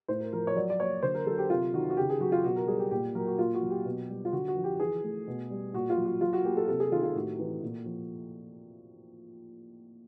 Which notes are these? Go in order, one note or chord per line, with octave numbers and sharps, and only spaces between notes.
A2 C5
A#4
F3 A#4
C#5
F#3 D5
D5
A#3 C#5
D3 C5
A#4
F#3 A4
G4
C3 F4
D#3 F#4
F#4
C#3 G4
G#4
F#3 F#4
F4
B2 F#4
A#4
G3 G#4
G4
A#2 G4
F#3 A#4
F#4
A#2 F4
F#4
F#3
G4
B2
G3
F4
D3 F#4
F#4
F3
G4
E3 G#4
A3
B2
G3
A#2 F#4
F4
F#3
F#4
F#3 F4
F#4
A#3 G4
A4
C3 A4
G#4
D#3 F4
F4
A2 F#4
E3
A#2
F3